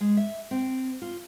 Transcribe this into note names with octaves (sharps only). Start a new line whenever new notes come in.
G#3
E5
C4
F4